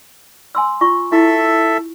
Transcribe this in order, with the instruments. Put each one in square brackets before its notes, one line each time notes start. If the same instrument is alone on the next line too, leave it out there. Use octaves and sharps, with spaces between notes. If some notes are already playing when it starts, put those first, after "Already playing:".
[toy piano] G#5 C6 E6
F4 C#6
[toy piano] E4 [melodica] A4 E5